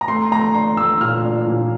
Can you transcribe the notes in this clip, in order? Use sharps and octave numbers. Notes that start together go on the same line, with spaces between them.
A#5
A3 C6
A3 A#5
D4 C6
A3 E6
A#2 F6
D4
A#2